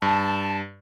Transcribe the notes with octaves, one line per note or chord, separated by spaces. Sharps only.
G2 A5